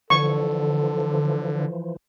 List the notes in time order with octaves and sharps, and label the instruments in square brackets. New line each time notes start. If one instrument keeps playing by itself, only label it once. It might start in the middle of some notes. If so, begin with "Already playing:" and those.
[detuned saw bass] D3 [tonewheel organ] E3 F3 [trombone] A4 [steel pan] C#6